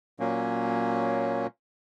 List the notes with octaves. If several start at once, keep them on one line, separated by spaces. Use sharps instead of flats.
A#2 F#3 A#3 C#4